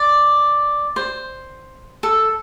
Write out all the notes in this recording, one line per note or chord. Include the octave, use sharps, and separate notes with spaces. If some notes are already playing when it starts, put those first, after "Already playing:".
Already playing: D5
C5
A4